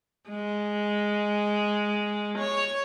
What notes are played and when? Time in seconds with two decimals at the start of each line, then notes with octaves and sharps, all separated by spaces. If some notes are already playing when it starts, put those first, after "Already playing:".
0.30 G#3
2.38 C#5